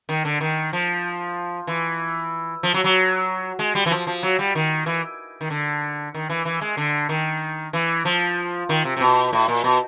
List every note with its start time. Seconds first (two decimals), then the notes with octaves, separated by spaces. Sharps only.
0.09 D#3
0.25 D3
0.41 D#3
0.73 F3
1.67 E3
2.63 F3
2.74 F#3
2.84 F#3
3.59 G#3
3.75 G3
3.86 E3
3.91 F3
4.07 F3
4.23 F#3
4.39 G3
4.55 D#3
4.86 E3
5.41 D#3
5.50 D3
6.15 D#3
6.29 E3
6.45 E3
6.61 G#3
6.77 D3
7.09 D#3
7.73 E3
8.05 F3
8.69 D#3
8.85 C3
8.97 C3
9.01 B2
9.33 A2
9.48 A#2
9.64 B2